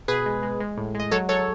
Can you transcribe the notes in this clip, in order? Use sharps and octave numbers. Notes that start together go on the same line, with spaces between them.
B2 G#4 B4
G#3
G#3
G#3
A2
G#3 D#5
F#3 A4 C#5
F#3 A4 C#5